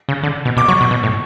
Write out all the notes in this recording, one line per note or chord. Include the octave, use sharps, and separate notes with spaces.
C#3
D3
B2
B2 D6
F#3 C#6
B2
B2
A2